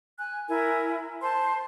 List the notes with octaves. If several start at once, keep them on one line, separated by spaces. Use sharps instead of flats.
G#5 F#6
E4 A#4 G#5
C5 A5 C6